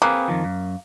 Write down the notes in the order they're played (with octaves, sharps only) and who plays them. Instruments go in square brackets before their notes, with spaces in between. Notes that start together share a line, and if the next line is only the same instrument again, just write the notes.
[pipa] A#3 [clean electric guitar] C4 G#4 B4
[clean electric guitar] F2 D#3 F3
F#2